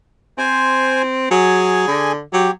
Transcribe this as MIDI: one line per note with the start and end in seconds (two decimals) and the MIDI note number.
0.38 1.30 60
0.38 1.02 72
0.38 1.02 80
1.31 1.84 54
1.31 2.12 68
1.31 2.12 80
1.88 2.21 50
2.33 2.50 54
2.33 2.51 67